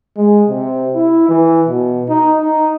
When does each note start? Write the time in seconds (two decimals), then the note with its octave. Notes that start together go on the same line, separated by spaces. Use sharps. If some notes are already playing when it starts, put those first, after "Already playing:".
0.17 G#3
0.49 C3
0.95 E4
1.29 E3
1.67 B2
2.09 D#4
2.41 D#4